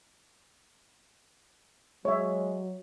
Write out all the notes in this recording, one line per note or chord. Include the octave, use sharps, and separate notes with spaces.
F#3 G#3 C#5 E5